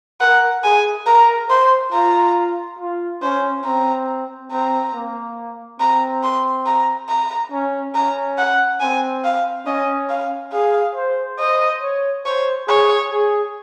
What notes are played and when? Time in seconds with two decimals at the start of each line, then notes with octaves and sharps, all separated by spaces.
0.20 A#4 F#5
0.63 G#4 G#5
1.06 A#4 A#5
1.50 C5 C6
1.92 F4 A#5
2.79 F4
3.22 C#4 C5
3.64 C4 A#5
4.51 C4 A#5
4.94 A#3
5.80 C4 A#5
6.23 C6
6.66 A#5
7.08 A#5
7.51 C#4
7.94 C#4 A#5
8.38 F#5
8.80 C4 G#5
9.24 F5
9.66 C#4 D#5
10.09 F5
10.53 G#4 F5
10.95 C5
11.39 C5 D#5
11.82 C#5
12.24 C5 C#5
12.67 G#4 C#5
13.11 G#4